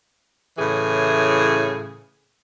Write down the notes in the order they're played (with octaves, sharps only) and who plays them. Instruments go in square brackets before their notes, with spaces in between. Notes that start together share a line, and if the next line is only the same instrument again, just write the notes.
[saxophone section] A2 C#3 E3 G#4